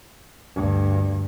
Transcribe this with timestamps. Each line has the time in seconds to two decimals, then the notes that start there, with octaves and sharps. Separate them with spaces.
0.54 D2 G2